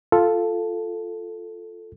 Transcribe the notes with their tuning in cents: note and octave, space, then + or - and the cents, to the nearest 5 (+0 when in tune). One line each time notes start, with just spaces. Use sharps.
F4 +0 A4 +0